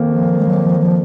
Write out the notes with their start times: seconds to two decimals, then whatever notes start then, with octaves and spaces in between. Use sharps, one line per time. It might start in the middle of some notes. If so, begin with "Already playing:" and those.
Already playing: F2 D#3 A#3
0.12 F3
0.38 G#3
0.46 F#3
0.62 F3
0.80 F3